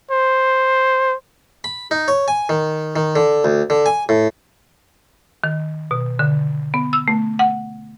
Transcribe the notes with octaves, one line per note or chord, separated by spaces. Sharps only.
C5
B5
D#4
C#5
G#5
D#3
D#3
D3
D2
D3
G#5
A2
D#3
B2
D3
B3
E6
A3
F#5